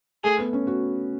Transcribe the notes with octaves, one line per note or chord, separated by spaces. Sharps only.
A3 G#4
B3
C#4
F#4